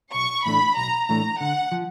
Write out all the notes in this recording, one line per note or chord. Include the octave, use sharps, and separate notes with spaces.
B1 C#6
A2 E3 A3 D4 B5
B1 A#5
A2 E3 A3 D4 A#5
D3 F#5
F3